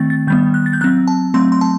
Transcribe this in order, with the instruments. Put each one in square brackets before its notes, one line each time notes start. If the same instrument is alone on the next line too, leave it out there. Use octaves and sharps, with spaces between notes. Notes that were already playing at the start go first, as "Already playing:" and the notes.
Already playing: [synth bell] D#3 A3 C4 A6
A6
D#3 G3 B3 G6
F#6
A6
G6
F#3 C4 F#6
A5
F#3 A3 C4 C6
C6
A5